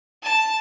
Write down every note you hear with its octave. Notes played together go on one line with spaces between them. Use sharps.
A5